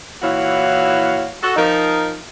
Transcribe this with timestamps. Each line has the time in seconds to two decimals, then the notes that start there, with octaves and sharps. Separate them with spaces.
0.23 A#2 E3 E4 F#4 C#5 F5
1.43 F#4 A4
1.56 F3 D#4 A#4